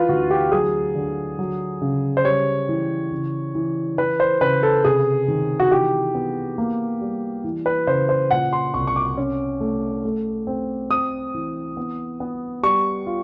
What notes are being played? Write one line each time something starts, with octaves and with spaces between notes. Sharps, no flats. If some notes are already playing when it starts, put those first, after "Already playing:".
Already playing: E3 F4 B4
D2 F#4
G4
F#3 G#4
D3
F#3
C#3
C5
G3 C#5
E3
C#3
E3
E3 B4
C5
C#3 B4
A4
C3 G#4
D#3
F#4
E3 G4
B3
A#3
G3
E3
B4
C#3 C5
C5
A#2 F#5
C6
C2 C#6
C#6
D6
C#4
A3
A3
C4
C4 D#6
E3
B3
B3
G3 C#6
F4